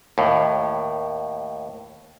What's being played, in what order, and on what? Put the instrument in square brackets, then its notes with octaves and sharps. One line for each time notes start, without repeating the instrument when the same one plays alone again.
[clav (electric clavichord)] D#2 A2